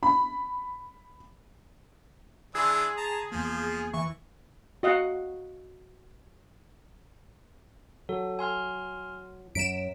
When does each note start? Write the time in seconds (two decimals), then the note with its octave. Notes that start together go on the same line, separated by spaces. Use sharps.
0.03 B5
2.55 E3 D4 G#4 C6 E6 G#6
2.97 A5 A#5
3.32 E2 F3 A#3
3.94 E3 C#6
4.83 F#4 D#5 F5 F#5
8.09 F#3 A4
8.39 G#5 C6 F6
9.55 F#2 F#3 B6 D7 E7